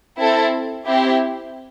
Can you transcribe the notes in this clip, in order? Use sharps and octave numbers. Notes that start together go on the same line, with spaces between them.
C4 E4 A4
C4 E4 G4